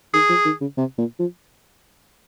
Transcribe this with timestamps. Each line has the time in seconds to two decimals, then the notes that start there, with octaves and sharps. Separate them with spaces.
0.13 D#3 G#4
0.29 F3
0.45 D#3
0.61 C#3
0.78 C3
0.98 A#2
1.19 F3